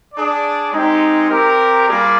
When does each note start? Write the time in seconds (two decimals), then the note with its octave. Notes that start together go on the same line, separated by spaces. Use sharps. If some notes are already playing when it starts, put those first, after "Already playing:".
0.14 D4 G#4 D5
0.72 G#3 C4 D#4 G4
1.30 C4 G4 A#4
1.89 G3 A#3 F4 G#4 D5